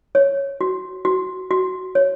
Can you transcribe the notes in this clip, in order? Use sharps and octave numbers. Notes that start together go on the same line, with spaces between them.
C#5
F#4
F#4
F#4
C#5